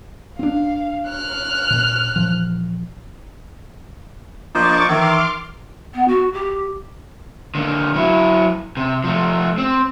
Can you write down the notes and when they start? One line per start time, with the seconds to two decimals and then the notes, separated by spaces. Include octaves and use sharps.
0.39 C4 D4 F5
1.09 F6 F#6
1.70 A#2
2.16 A#2 E3 F3
4.55 F3 A#3 D4 D#5 C#6 D6 A6
4.89 D#3 E3 E5 C6 D6 F6
5.94 B3
6.08 F#4
6.33 G4
7.55 D3 A#3
7.96 F#3 E4
8.77 C3
9.04 F3 A3
9.58 C4